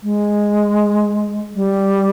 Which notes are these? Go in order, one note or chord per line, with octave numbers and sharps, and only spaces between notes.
G#3
G3